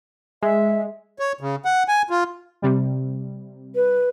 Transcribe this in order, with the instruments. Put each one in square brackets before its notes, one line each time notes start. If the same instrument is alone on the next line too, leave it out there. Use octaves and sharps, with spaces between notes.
[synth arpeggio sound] G#3 [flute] E5
[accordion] C#5
C#3
F#5
G#5
F4
[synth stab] C3 G3
[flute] B4